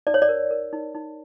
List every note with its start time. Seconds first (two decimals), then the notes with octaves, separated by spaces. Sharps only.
0.07 D#4 D5
0.14 C#5
0.22 D5
0.29 A#4
0.51 A#4
0.73 D#4
0.95 D#4